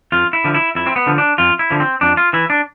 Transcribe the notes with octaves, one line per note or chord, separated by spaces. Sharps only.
F2 F4
E4
D3 F3
E4
F2 E4
C4
B3
D3 F3
D4
F2 F4
E4
D3 F3
C4
F2 D4
F4
E3 E4
D4